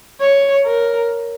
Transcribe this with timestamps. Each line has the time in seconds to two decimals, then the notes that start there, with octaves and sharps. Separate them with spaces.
0.21 C#5
0.66 A#4